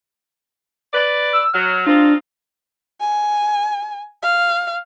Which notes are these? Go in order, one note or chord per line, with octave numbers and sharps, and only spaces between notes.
B4 D5 A6
E6
F#3 F6
C4 D4 D#4 F4
G#5
F5